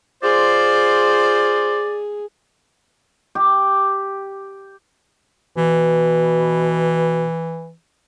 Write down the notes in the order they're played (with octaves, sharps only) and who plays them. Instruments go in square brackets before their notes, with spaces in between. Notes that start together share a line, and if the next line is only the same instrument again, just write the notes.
[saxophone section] F4 C5 [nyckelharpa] G#4 [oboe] D5
[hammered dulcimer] G4
[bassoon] B2 [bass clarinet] E3